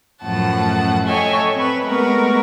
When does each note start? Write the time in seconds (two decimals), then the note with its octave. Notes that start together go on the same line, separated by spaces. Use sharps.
0.23 F#2 A2 F3 F#5 A5
1.06 A4 C#5 D#5 E5 G5 G#5
1.54 C4 B4
1.84 G#3 A3 B3 A#4 B4 C#6